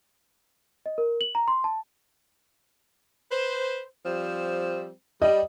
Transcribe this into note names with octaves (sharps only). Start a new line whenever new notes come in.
D#5
A#4
F#7
A#5
C6
A5
B4 C5
F3 G3 C4
G3 D#5